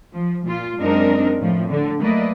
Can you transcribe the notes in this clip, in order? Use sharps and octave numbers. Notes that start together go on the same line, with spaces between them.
F3
A#2 F4
F#2 G#3 C4 D4 D#4 A#4
F2 A2 F3
D3
F#3 A3 A#3 B4 D5 D#5